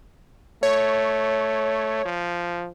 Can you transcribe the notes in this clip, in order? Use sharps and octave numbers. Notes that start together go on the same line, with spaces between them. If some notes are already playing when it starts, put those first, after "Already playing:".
A3 C#5
F3